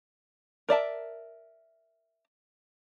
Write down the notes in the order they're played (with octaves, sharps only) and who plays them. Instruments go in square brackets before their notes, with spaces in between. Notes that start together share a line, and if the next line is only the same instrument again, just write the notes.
[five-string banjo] A#4 D5 E5 A5